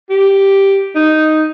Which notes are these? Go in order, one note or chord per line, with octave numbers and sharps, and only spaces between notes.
G4
D#4